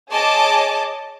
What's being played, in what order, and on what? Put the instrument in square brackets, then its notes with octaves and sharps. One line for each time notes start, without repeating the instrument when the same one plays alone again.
[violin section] G#4 C#5 D#5 A5 D6